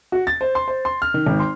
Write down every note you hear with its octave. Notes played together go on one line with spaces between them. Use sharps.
F#4
A6
C5
C6
C5
C6
F6
D#3
G#1
C6